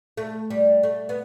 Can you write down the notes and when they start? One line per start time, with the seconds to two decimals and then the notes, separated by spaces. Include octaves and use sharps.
0.17 A3
0.50 G3
0.83 A3
1.09 B3